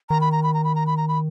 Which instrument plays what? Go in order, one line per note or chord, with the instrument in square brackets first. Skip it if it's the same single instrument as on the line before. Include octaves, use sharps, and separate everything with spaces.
[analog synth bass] D#3 [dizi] A#5
[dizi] B5
A#5
B5
A#5
B5
A#5
B5
A#5
B5